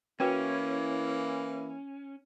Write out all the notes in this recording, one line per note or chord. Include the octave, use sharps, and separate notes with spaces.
E3 A#3 C#4 E4 F#4 B4 G5